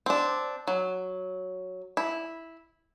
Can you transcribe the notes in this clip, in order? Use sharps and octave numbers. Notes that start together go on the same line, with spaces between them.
C4 D4
F#3
E4